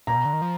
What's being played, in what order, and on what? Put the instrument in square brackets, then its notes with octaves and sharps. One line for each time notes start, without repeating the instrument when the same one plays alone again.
[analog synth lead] A#2 [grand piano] A#5
[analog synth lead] B2
D3
D#3
F3